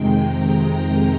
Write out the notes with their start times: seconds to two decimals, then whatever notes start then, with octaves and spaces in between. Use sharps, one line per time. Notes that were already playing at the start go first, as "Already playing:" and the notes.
Already playing: F2 C3 D#3 G#3 G5
0.19 A#5